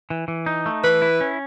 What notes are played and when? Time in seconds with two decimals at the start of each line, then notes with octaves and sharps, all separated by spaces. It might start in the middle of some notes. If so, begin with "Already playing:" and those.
0.10 E3
0.28 E3
0.46 D#4
0.66 A3
0.84 E3 B4
1.02 E4
1.21 C#4